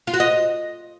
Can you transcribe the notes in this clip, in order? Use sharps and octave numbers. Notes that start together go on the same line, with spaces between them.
F4
F#4
D#5